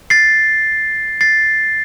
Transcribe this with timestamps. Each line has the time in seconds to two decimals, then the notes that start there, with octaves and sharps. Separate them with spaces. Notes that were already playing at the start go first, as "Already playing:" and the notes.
0.10 A6 C7
1.21 A6 C7